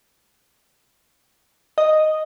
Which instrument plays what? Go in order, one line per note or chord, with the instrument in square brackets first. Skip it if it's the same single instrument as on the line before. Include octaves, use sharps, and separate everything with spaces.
[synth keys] D#5